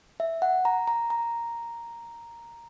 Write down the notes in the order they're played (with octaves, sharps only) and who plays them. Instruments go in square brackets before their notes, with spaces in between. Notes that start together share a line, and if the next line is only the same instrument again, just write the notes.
[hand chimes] E5
F#5
A#5
A#5
A#5